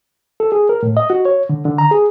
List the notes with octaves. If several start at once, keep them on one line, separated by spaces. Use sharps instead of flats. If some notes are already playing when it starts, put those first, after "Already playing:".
A4
G#4
A#4
A2
D#5
F#4
C#5
D3
D3
A#5
G#4